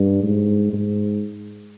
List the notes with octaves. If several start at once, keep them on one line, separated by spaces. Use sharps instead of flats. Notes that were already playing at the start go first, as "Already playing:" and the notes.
Already playing: G2
G#2
G#2